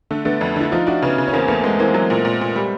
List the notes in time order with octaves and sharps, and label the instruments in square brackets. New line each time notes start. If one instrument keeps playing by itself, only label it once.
[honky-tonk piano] D3 [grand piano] A3
[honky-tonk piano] D3 [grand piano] A3 B3
[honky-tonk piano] F2
[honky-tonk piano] D3 [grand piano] E4
[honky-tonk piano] F3 [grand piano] D#4 F4
[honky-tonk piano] D4 [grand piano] E4 F#4
[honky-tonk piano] C#3 [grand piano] B3 C#4
[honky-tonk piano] C#3
[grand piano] C#4
[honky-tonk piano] E2 [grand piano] A#3 C4
[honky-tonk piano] E2 [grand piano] A3 B3
[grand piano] B3
[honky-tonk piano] E2 [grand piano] G#3 A#3
[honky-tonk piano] E3 [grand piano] A#3 C4
[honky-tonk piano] F#3
A#2
A#2
A#2
G3